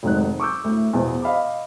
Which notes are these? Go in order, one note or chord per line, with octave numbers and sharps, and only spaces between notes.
F1 G#2 D#3 F#3 D#4 F#6
C#6 D6 E6 G6
D2 A2
E2 B2 F3
D#5 F5 B5 D6